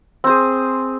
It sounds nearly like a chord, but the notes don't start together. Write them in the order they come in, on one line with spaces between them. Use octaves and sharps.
C4 C5 G#4